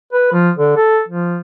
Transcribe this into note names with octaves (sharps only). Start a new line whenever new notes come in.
B4
F3
D3
A4
F3